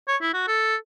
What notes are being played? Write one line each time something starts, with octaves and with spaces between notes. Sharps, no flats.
C#5
E4
F#4
A4